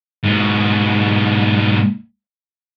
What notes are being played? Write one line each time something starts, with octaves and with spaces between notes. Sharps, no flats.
G#2 B2